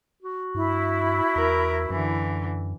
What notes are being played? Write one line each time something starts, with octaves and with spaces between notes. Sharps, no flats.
F#4
G2 E4
E2 A#4
F#2 D3 E3